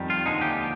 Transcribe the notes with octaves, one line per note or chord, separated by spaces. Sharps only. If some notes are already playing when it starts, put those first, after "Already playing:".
Already playing: F2 D#3 G3
F4
D#2 D3 F3 G#3 D#4
G4